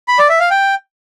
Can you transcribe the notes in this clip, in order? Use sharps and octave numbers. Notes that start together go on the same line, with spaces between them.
B5
D5
E5
F5
G5